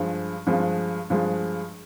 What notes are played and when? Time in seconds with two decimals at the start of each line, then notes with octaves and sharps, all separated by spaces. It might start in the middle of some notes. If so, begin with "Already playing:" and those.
Already playing: G2 F3 G#3
0.46 G2 F3 G#3
1.10 G2 F3 G#3